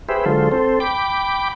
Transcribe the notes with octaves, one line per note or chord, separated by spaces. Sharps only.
G4 G#4 B4 C5 E5
D3 F#3 G#3 F4 A4 C5
C4 A4 C5
G5 B5 D6